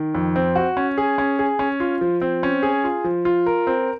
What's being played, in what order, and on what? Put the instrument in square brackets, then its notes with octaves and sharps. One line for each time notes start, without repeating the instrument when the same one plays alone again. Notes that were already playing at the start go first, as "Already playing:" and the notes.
Already playing: [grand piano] D#3
F2
C4
F#4
C#4
G#4
C#4
G#4
C#4
F4
F3
C4
C#4
G#4
F4
F3
F4
A#4
C4